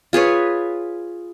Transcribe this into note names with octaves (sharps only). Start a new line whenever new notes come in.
F4 G#4 B4 C#5